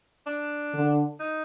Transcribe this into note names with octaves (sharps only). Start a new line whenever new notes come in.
D4
D3
D#4